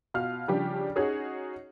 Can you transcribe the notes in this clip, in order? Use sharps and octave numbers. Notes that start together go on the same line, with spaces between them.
B2 F4 F5 F6
C#3 F3 G3 D4 G4
C#4 D#4 F#4 G#4 C#5